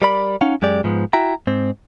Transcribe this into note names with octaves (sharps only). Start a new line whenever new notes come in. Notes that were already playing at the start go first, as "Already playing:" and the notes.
G3 A#4 D5 B5
C#4 D#4 F5 F#5
F#2 G#3 G4 D5
G#2 F3 B3
E4 F#4 E5 G5 A#5
G#2 C4